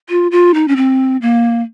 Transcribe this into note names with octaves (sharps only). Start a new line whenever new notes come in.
F4
F4
D#4
C#4
C4
A#3